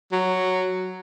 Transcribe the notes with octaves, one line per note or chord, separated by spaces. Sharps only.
F#3